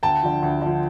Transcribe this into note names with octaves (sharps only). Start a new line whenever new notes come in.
D2 G5 A5
D3 F3
D2
D3 F3